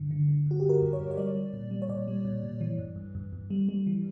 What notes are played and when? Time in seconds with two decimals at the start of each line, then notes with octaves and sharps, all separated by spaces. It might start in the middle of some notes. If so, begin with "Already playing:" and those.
Already playing: G2 D3
0.11 D3
0.28 D3
0.46 G2 F#4
0.60 G2 G4
0.69 A#4
0.82 G2
0.93 C#5
0.99 G2
1.11 C#5
1.17 G3 D5
1.35 G3
1.53 A#2
1.71 G3
1.82 C#5
1.89 A#2 D5
2.08 G3
2.25 A#2
2.43 A#2
2.61 E3
2.78 G2
2.96 G2
3.15 G2
3.33 G2
3.50 G3
3.69 G3
3.87 E3